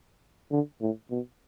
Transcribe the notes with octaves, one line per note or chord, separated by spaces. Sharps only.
D3
A2
B2